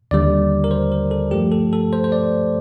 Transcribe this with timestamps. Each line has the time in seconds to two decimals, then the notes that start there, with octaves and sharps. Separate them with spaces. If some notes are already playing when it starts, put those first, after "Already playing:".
0.11 D#2 D3 G3 D5
0.64 A#4
0.71 C5
0.92 A#4
1.11 A4
1.31 G2 F3 A3 G4
1.52 A4
1.73 A4
1.93 C5
2.04 C5
2.12 D5